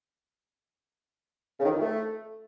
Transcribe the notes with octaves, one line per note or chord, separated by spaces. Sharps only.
C#3
D#3
F2
D#3
A3